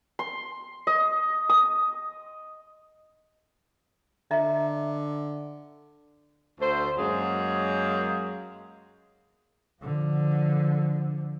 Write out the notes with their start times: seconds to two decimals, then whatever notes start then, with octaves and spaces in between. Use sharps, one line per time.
0.19 C6
0.87 D#5
1.49 D#6
4.31 D3 D#5 E5 A#5
6.60 D2 A3 C5
6.97 F#2 F#3 G#3 A#3 G#4
9.82 D3 F3